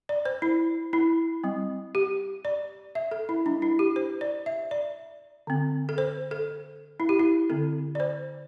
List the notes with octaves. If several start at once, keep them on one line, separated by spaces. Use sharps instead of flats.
D5
C5
E4
E4
G3 C4
G4
D5
E5
A4
E4
G3 D4
E4
G4
C5
D5
E5
D5
D3 C4
A4
C5
A4
E4
G4
E4
D3 C4 A4
D5
C5